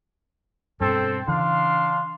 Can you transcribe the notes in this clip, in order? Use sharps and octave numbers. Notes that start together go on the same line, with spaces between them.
G2 B2 C4 A4
C#3 E3 D4 F5 C6